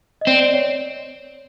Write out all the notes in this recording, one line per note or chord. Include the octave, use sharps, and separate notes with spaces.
D#5
C4 D5
C#5